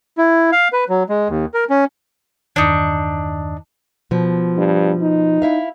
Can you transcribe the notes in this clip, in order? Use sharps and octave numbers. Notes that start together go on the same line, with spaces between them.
E4
F5
B4
F#3
G#3
D#2
A#4
C#4
E2 G2 D#3 D4 D#4
B2 F3
G2
D#4
E4 E5 F5